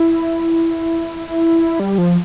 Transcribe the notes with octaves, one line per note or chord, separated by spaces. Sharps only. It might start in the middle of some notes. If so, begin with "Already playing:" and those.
Already playing: E4
G3
F3